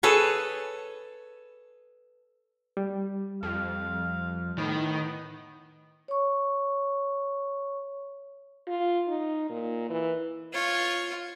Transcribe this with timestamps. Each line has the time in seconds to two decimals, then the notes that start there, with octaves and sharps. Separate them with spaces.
0.03 G#4 A4 B4 C#5
2.77 G3
3.43 F2 F5
4.58 A2 D#3 B3
6.08 C#5 C#6
8.67 F4
9.08 D#4
9.50 A#2
9.89 E3
10.53 F4 C#5